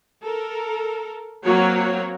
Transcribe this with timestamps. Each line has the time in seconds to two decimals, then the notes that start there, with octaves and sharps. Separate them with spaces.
0.22 A4 A#4
1.45 F#3 A#3 C4 F#4 C#5